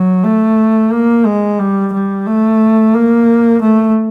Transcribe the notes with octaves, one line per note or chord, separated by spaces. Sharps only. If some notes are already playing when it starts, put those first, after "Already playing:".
Already playing: F#3
A3
A#3
G#3
G3
G3
A3
A#3
A3